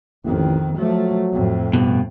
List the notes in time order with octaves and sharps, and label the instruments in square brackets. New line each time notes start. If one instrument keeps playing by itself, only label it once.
[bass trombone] A1 [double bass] F2 D#3
[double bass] F3 A3 [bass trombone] F#3
[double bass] F2 A2
[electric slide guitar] G2 B2